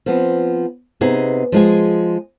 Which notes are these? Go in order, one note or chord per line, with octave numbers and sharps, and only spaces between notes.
F3 B3 C4
C3 B3 D#4 G#4
F3 G#3 F4 G#4